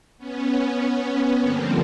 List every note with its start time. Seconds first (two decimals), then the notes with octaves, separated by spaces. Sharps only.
0.18 B3 C#4
1.40 G2 D3 F3 A#3 C4